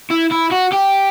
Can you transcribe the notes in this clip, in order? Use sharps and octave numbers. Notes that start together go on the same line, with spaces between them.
E4
E4
F#4
G4